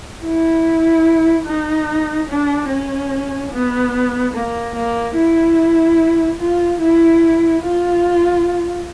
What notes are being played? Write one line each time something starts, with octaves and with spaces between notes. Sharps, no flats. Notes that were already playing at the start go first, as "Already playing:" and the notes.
E4
D#4
D4
C#4
B3
A#3
A#3
E4
F4
E4
F4